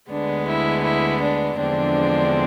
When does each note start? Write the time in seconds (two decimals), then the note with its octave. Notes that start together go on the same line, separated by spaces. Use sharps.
0.11 D2 D3 G#3 B3 D4
0.48 E4
0.85 E4
1.22 D4
1.59 E2 D3 F3 G#3 C4 D4